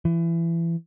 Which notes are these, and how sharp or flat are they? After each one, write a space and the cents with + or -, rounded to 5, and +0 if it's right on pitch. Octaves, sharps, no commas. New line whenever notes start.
E3 +25